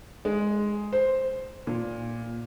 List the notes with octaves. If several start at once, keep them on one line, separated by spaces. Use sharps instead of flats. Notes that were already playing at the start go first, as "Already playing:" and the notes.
G#3
C5
A#2